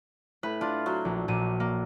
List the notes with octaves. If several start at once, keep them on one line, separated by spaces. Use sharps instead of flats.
A2 B4 B5
D4 F4
F#3
A#1
A#1 A#2 D#7
A#3